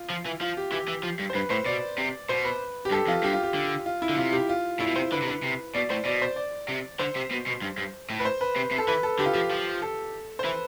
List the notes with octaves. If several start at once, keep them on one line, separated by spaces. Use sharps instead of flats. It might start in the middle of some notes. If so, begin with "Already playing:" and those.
Already playing: F4
F3
E3
F3 F4
G4
E3 G4
E3
F3
G2
C5
G2 B4
A2 C5
B2 D5
C3
B2 C5
B4
G4
G2 A4
F2 F4
G2 G4
F4
G4
D3
F4
E4
D3
C3 F4
G4
F4
A2 E4
B2
C3 C5
D3 B4
C3
D3 B4
C3
B2 D5
A2 C5
B2 D5
C5
D5
C3
D3 C5
C3
B2
B2
G2
G2
A2
B4
C5
B4
C3
C3
A4
E3 B4
A4
D3 G4
F4
F3 G4
F3
A4
C5
E3 B4